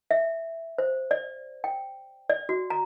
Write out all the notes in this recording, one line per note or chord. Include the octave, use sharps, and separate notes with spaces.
E5
C5
D5
G5
D5
F#4
A#5